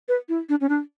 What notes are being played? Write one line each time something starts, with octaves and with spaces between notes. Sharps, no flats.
B4
E4
D4
C#4
D4